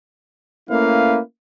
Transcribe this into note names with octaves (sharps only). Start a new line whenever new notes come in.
A3 A#3 C#4 E4 B4 F5